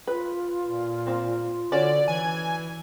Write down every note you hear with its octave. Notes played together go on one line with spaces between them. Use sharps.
F4 B4
A#2
A#3 C4
D3 C#4 F#4 C#5 D5
E3 G#5